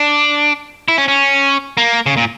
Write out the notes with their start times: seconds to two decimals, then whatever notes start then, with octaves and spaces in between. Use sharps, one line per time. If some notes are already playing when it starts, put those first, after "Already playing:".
Already playing: D4
0.88 E4
0.98 C#4
1.08 C#4
1.77 A#3
2.06 C#3
2.17 A#2